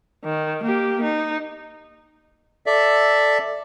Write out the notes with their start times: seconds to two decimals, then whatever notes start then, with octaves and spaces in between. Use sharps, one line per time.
0.24 D#3
0.63 A#3 G4
1.03 D#4
2.66 A4 D5 E5